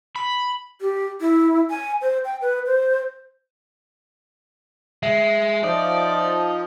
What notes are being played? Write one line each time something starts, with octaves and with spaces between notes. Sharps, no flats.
B5
G4
E4
G#5
C5
G5
B4
C5
G#3 E5
F3 D#4 D5